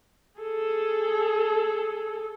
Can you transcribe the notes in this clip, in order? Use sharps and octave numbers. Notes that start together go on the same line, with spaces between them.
G#4 A4